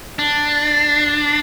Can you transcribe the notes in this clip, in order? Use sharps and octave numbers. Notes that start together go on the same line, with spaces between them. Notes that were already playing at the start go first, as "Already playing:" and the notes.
D4